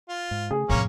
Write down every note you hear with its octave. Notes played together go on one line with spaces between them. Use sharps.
F4
G#2
C#3 A3 G#4
F2 A2 C3 A#3 C#4